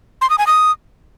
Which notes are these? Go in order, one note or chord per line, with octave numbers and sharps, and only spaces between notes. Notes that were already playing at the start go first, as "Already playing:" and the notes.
C6
D#6
G#5
D#6